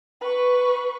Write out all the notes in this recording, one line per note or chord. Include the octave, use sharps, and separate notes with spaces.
B4 C#6